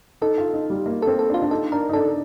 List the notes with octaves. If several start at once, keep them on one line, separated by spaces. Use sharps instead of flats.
D#4 A4
F4
D#4
G3
A#3
C4 A4
A4
D4
F4
D4
D#4 A4
D4 A#4
D#4
D4 A4